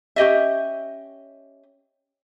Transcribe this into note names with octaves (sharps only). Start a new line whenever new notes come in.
C#4 G4 D#5 E5